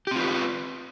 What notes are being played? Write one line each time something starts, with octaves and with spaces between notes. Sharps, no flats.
C4 F4 G4 B4